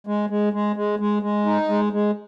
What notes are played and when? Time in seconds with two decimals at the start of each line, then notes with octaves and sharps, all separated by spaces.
0.07 G#3
0.30 G#3
0.53 G#3
0.76 G#3
0.99 G#3
1.22 G#3
1.46 D#4
1.69 G#3
1.93 G#3